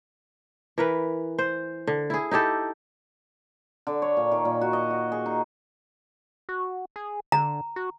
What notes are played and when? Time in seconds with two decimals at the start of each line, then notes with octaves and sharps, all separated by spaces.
0.78 E3 A#4 B4
1.39 C5
1.87 D3
2.10 E4 G#4
2.31 D#4 E4 G4 A4
3.87 D3
4.02 C#5
4.17 A#2
4.31 D#3
4.45 A#2
4.61 F#4
4.73 D#5
4.90 F#4
5.12 G#4
5.26 D#4
6.49 F#4
6.96 G#4
7.32 D3 A#5
7.76 F#4